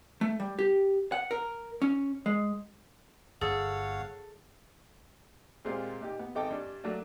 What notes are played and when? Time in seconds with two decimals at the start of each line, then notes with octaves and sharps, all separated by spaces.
0.21 A3
0.40 G3
0.59 G4
1.12 F#5
1.31 A#4
1.82 C#4
2.26 G#3
3.41 G1 G#4 A4 C#5 F5 F#5
5.65 A#2 G#3 C4 F4 G4
6.01 A#2 D#4 G4
6.19 B3
6.35 G#1 D#4 A4 D#5 G5 D6
6.50 G2 D4
6.84 F#3 A3 A#3 D4